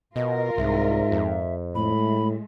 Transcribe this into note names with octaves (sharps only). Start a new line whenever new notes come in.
B2 F4 A#4 D#5
C2 G#2 E5
F2
A2 G#3 A3 B5